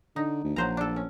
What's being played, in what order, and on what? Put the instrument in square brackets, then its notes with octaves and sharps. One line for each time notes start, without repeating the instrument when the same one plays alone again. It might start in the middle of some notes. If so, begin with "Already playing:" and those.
[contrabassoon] D3 [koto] D#4
[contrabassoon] D2
[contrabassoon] A#1 [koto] F#3 C5 A#5
[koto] D4 A4
C#4